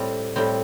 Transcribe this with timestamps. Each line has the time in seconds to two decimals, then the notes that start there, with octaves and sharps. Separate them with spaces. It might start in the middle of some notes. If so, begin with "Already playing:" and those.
Already playing: A2 G3 C4
0.36 A2 G3 C4